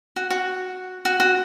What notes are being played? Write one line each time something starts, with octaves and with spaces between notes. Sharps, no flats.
F#4
F#4
F#4
F#4